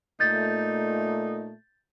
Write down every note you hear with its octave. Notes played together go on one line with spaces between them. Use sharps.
A#2 A3 D#4 G6 A6